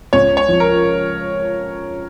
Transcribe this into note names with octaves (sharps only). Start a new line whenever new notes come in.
C#2 C#5
C#5
F3
A#4